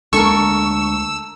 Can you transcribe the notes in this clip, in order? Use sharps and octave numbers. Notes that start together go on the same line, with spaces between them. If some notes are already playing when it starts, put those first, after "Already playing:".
D2 G#3 D4 A4 A#4 C#6 E6